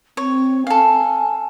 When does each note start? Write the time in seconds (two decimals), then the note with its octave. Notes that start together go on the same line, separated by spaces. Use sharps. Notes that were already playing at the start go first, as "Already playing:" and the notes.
0.17 C4 C#5
0.67 A4 F5 G#5